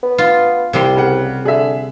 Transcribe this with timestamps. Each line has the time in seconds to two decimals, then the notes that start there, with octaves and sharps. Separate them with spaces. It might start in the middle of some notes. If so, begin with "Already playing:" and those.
0.03 B3
0.18 F4
0.73 C2 C3 G3 C6
0.96 C#3 F#5
1.45 D3 G#4 E5